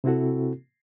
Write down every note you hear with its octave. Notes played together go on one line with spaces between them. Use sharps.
C3 C4 E4 F#4 A4